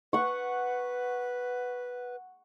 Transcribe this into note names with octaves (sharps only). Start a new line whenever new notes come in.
B4 F#5 C#6